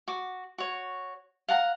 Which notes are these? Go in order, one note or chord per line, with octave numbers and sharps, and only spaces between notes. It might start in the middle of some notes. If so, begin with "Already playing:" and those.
F#4 D6
F#4 C#5
F5 F#5 A5 A#5